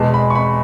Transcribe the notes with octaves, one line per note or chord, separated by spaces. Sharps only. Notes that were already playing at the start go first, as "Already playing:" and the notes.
Already playing: E2 B2 G#3 A5
B5
C#6
B5